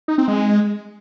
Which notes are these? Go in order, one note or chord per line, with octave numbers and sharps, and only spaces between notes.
D#4
C4
G#3